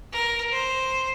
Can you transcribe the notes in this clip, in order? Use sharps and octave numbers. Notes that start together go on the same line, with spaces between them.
A#4
C5